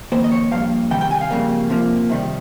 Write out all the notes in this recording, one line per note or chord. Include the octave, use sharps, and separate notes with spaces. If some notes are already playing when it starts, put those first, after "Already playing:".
F2 D#3 A#3 C5
D#5
C#5
G2 F3 A#3 F5
C3 D#3 G3 G5
G5
G#5
F5
F2 C#3 G3 A#3
C3 F3 A#3
C3 D#3 G3